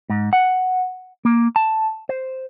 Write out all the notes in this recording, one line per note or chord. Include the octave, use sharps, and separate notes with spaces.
G#2
F#5
A#3
A5
C5